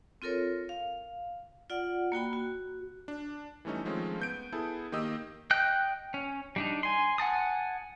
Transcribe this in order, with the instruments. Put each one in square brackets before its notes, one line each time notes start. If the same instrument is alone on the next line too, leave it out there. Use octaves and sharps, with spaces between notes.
[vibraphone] C4 F4 A4 A#4 C#5
F5
F4 D5 F#5
A#3 F#4 G5 B5
F#4
[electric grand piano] D4
E3 G3 A3 C#4 D#4
D#3 F3 G#3 A3 C4 C#4
B3 G6 D7
B3 E4 G#4 A4
D#3 A#3 G4 D#5 D#6 E6
[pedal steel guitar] D#5 G5 F#6 G6
C#4
G3 D4 D#4
G#5 C6
F#5 G#5 A5 D#6